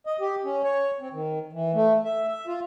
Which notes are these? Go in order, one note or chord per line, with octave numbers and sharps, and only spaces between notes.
D#5
G4
C#4
C#5
C4
D#3
E3
A3
E5
E5
F4